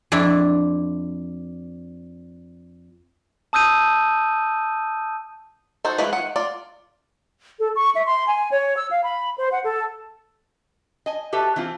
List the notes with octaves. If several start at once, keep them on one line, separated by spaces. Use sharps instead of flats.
F2 D4 E4
A5 D#6 E6 G6 D#7
D#4 F#4 A4 C5
E3 G#3 F4 F#4 B4
D#3 F#5
F4 D5
A4
C#6
E5
C6
G#5
C#5
E6
F5
B5
C5
F#5
A4
D#5 G#5
F#4 G4 A4 B4 E5
E3 C4 F4